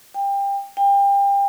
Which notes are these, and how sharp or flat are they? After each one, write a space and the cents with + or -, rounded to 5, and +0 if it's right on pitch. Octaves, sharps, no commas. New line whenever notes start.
G5 +25
G5 +30